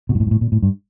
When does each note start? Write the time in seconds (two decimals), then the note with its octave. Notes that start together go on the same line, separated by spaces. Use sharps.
0.09 B2
0.15 G#2
0.20 A2
0.27 G#2
0.31 A2
0.41 A#2
0.52 A2
0.62 G2